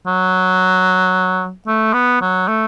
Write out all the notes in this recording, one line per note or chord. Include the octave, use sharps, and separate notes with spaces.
F#3
A3
B3
F#3
A3